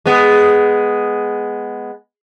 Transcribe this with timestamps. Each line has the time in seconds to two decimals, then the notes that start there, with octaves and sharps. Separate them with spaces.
0.06 G#3 B3